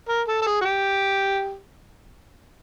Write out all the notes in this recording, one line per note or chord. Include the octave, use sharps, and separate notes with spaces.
A#4
A4
A4
G#4
F#4
G4